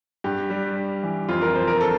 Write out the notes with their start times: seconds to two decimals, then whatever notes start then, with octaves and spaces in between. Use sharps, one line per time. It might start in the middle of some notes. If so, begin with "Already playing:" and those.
0.24 G2 G4
0.50 G3
0.76 G2
1.03 E3
1.29 F2 F4
1.42 A#4
1.54 F3 C5
1.68 A#4
1.81 A4